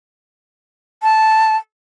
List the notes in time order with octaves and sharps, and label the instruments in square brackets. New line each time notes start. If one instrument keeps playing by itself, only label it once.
[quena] A5